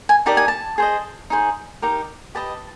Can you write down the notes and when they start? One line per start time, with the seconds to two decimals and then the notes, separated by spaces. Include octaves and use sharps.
0.09 G#5
0.26 D#4 G4 A#4 D5 A5
0.37 G#5
0.48 A5
0.78 G#4 C5 D#5
1.30 D#4 G#4 C5
1.82 D#4 G4 A#4
2.35 G4 B4 D#5 A5